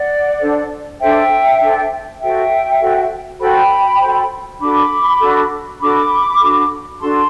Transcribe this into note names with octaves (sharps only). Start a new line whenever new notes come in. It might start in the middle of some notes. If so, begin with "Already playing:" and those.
Already playing: D5 F#5
D4 A4 C5
D4 A4 C5 E5 G5
D4 A4 C5
F#4 A4 C5 E5 G5
F#4 A4 C5
F#4 A4 C5 G5 B5
F#4 A4 C5
D4 F#4 A4 B5 D6
D4 F#4 A4
D4 F#4 A4 B5 D6
D4 F#4 A4
D4 F#4 A4 A5 C6